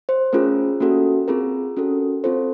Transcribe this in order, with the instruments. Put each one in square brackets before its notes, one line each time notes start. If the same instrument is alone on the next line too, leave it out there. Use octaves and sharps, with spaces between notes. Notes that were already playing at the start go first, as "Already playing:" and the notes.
[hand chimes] C5
A3 C#4 F4 G#4 A#4
A#3 C#4 F#4 A4
C4 F4 G#4 A#4
C#4 F#4 A4
C4 F4 A4 C5